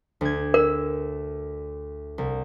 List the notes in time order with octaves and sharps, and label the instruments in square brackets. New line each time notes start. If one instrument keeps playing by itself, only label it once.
[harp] D2 G#6
[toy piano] A#4 [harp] E6
[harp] C2